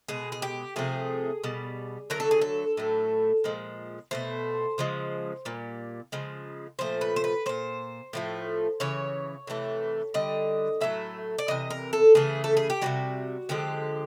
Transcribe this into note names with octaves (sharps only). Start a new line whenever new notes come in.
B2 G#3 G#4
G#4
G4
C3 F3 A3 G#4
B2 G3
D3 F#3 A3 A#4
A4
G#4
A4
A2 F#3 A3
A#2 F3 G#3
B2 F#3 A3 C5
C#3 F3 G#3
A#2 G3
C#3 F3 G#3
A#2 F3 A3 C5
B4
C5
B4
A#2 G3 C5
A2 F3 A3
C#3 E3 C#5
C3 E3 A3
D3 G3 D#5
A2 F#3 A3 E5
D5
C3 E3 D#5
A#4
A4
C#3 E3 A3 G#4
A4
G#4
G4
C3 E3 G3 F#4
D3 F3 G#3 G4